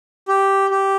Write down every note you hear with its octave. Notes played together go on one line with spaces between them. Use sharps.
G4
G4